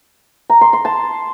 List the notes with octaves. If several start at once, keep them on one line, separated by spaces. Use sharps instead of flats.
A#5
C6
C6
A5